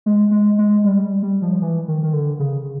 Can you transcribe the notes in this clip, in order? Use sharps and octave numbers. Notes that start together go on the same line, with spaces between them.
G#3
G#3
G#3
G3
G3
F3
E3
D#3
D#3
D3
C#3